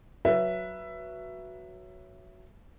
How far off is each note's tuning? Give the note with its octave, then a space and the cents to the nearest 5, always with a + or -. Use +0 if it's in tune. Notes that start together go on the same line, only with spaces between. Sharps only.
F#3 +0 B4 -15 E5 +15